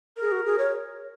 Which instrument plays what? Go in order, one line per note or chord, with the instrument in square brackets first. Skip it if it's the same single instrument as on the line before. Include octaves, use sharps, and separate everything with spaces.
[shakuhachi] G#4 [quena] A#4
[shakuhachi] F#4
G#4
C#5